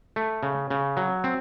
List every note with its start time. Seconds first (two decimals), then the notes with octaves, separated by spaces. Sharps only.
0.16 A3
0.43 C#3
0.70 C#3
0.97 F#3
1.24 C4